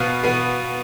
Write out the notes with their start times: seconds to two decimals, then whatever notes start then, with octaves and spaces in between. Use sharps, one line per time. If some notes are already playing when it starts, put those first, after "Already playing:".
Already playing: B2 B3 F5
0.23 B2 B3